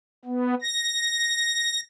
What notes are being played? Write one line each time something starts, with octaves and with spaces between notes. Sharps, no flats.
B3
A#6